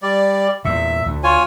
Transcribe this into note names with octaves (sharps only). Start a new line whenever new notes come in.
G3 D5
E2 A#2 E5
D2
F4 C#5 G#5